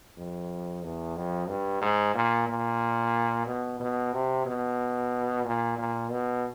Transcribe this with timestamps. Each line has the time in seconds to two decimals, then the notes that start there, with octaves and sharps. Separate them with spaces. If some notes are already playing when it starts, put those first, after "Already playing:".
0.17 F2
0.83 E2
1.16 F2
1.48 G2
1.82 G#2
2.15 A#2
2.48 A#2
3.47 B2
3.80 B2
4.13 C3
4.46 B2
5.45 A#2
5.78 A#2
6.11 B2